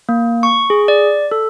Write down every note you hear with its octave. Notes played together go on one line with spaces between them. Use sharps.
A#3
C#6
G#4
D5
A4